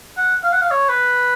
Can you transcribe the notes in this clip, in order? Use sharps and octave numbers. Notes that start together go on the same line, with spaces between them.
F#5
F5
F#5
F5
C#5
B4